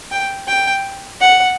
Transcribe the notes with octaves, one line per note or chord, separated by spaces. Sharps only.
G5
G5
F#5